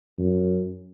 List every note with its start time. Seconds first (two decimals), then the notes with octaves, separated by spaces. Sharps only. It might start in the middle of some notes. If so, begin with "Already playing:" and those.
0.18 F#2